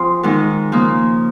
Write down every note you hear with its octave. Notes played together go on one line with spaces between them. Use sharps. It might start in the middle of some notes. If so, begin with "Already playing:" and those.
Already playing: F3 C4 F4 G#4
G#2 D#3 G#3
C#3 F3 A#3